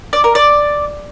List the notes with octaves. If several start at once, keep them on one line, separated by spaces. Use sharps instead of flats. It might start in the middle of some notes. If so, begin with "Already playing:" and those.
D5
A#4
D5